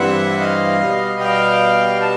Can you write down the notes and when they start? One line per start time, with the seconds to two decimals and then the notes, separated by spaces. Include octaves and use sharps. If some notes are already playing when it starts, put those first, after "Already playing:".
Already playing: G2 E3 G3 C4 E5 F#5
0.40 D#5 F5
0.80 B2 G3 B3
1.20 F5 G5
2.02 A5